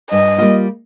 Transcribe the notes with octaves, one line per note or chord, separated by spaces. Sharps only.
G2 D#5
G3 A#3 F4